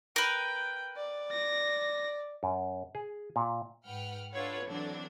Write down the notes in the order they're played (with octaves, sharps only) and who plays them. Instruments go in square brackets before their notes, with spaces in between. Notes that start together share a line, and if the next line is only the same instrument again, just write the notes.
[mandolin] A#4 B4 [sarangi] G5
[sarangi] D5
[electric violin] A#6
[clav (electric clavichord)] F#2
G#4
A#2
[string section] G#2 B4 F#5 G5 F6
D4 F4 A4 B4 C#5 F#5
D3 E3 F#3 C4 D4